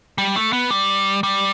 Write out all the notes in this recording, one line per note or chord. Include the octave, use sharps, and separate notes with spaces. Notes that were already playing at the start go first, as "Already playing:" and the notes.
G3
A3
B3
G3
G3